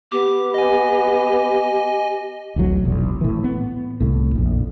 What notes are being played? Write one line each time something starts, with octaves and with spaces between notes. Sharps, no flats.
B3 G4 D6
D#5 G#5
D1 A1 F#3
F1 B1 E2
A2 E3
B3
C2 A2
A#1 F2